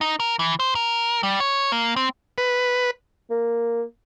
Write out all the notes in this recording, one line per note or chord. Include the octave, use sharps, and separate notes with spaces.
D#4
A#4
E3
C5
A#4
G3
C#5
A#3
C4
B4
A#3